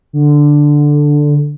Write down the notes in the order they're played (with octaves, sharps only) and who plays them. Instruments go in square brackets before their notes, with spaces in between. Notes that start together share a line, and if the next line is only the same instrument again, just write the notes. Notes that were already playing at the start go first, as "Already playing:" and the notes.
[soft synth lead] D3